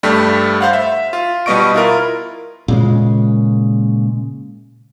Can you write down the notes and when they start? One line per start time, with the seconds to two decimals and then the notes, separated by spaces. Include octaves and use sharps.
0.03 G2 G3 A3
0.61 C5 F5 F#5
0.73 E5
1.13 F4
1.46 B2 G3 B3 D#5 C#6 D7
1.74 E4 F4 A#4
2.68 A#2 C#3 G#3